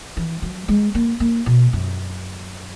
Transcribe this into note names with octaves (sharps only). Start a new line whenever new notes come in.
E3
F#3
G#3
A#3
A#3
B2
F#2